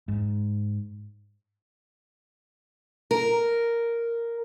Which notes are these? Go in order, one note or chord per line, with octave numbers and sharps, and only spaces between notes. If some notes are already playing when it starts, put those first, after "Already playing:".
G#2
A#4